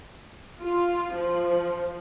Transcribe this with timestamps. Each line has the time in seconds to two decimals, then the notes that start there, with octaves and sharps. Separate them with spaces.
0.61 F4
1.15 F3